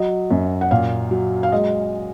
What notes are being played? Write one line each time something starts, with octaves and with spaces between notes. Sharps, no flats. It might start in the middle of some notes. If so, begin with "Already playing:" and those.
Already playing: F#3 D#5
F#2
F#5
A#2 F5
F#3
F5
G#3 D#5